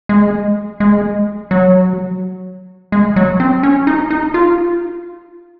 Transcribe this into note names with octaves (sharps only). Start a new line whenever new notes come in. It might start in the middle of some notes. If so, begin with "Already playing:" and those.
G#3
G#3
F#3
G#3
F#3
C4
C#4
D#4
D#4
F4